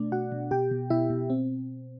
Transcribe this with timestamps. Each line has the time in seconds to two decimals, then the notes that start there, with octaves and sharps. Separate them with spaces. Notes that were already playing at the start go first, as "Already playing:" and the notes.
Already playing: B2 A3 D4 D5
0.12 B2 F#4 F#5
0.32 B2
0.51 B2 G4 G5
0.71 B2
0.90 B2 E4 E5
1.10 B2
1.30 C4